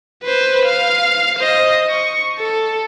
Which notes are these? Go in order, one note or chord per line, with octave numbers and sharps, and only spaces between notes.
B4 C5
F5
C5 D#5
C#6
A4